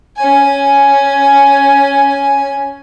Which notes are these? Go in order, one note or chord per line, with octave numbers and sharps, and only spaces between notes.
C#4 G#5